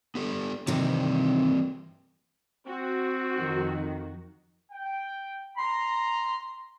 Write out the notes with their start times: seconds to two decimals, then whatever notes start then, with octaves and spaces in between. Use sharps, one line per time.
0.15 B3 G4 A4
0.67 C3 D#3 E3 G3 C4
2.67 C4 F#4
3.36 F2 D#3
4.72 G5
5.58 A#5 C6